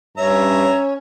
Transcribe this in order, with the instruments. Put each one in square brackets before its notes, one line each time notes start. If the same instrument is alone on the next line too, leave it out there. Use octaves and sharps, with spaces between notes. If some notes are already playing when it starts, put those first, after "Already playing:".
[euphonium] G2 [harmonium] C#4 [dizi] C#5 [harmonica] E5 A#5